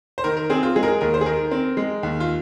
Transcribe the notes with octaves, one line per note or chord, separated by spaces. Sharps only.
C5
D#3 A#4
A#4
C4 G#4
F4
G#3 G#4
A#4
G#4
D#2 A#4
C5
G#4
D#3 A#4
C4
G#3
D#2
F4